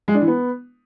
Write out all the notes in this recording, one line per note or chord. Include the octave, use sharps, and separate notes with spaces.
G#3
D4
E3
B3